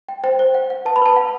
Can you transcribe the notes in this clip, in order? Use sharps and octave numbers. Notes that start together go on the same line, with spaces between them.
G5
C5 G5
C5
F#5
F#5
B4 A5
B5
B4 A5
F#5